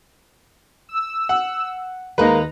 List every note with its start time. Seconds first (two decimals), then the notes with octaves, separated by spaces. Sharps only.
0.89 E6
1.29 F#5
2.18 D#2 G#3 A#3 D#4 B4 A#5